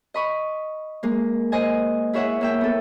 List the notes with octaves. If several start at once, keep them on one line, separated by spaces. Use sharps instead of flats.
D#5 B5 C#6
G#3 A#3
C5 D#5 G#5
E4 G#4 C#5 E5 F#5
A#3 E5 G5
B3 A4